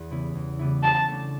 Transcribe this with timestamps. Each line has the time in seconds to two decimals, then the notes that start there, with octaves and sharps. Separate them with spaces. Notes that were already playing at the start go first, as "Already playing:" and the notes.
Already playing: E2
0.10 C#3 G3 B3 E4
0.35 E2
0.59 C#3 G3 B3 E4
0.84 F#3 A5
1.08 A3 D4